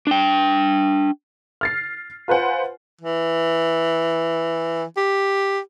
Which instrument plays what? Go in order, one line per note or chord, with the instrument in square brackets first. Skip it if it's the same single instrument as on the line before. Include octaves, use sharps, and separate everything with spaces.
[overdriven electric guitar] D4 G5
[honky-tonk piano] F6 A6 C7
F4 B4 C5 F#5 G#5
[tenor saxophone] E3
G4